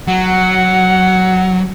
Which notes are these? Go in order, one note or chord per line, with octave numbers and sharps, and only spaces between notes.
F#3 F#5